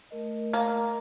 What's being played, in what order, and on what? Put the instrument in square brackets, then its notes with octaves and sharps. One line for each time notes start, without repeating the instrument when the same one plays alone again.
[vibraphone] A3 A#4 D#5
[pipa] A#3